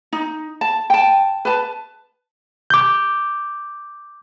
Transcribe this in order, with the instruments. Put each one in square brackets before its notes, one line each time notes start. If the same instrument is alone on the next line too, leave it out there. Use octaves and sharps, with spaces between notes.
[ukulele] D#4
A5
G5 A5
B4 A5
[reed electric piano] D6 G6